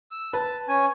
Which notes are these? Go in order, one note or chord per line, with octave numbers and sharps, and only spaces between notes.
E6
B4 A5
C#4 G#5